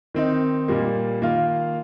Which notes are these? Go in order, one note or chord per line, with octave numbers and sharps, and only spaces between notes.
D#3 C4 D#4
A#2 G3 A#3
D#3 A#3 F4